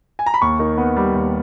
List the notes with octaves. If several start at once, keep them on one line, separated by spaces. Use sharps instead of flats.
G#5
A#5
B5
D#2 C#6
D#3
B3
G3
D#2